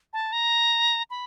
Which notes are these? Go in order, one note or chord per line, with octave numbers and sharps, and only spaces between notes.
A5
A#5
B5